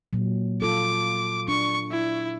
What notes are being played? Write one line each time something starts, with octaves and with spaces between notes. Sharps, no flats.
A#2 F#3
F4 A4 D6
D4 C#6
E4